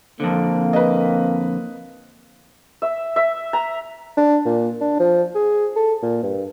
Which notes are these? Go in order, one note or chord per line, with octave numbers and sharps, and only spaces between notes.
F2 D3 A#3 C4
B4 D#5
E5
E5
A#5
D4
A#2
D4
F3
G#4
A4
A#2
G2